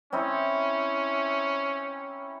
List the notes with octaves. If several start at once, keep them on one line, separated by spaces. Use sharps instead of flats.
C4 C#4 D#4 E4